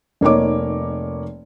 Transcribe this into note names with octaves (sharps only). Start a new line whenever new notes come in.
F1 A#3 D#4 C#5 D6